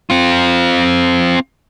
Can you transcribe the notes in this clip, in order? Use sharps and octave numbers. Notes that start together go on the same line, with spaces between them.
C4 F4